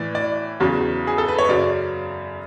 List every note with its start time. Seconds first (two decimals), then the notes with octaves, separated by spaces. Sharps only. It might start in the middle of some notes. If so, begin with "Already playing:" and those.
Already playing: A2 E3 D5
0.15 D5
0.60 E2 C#3 F#3
1.07 G#4
1.18 A4
1.28 B4
1.39 C#5
1.49 F#2 C#3 F#3 D5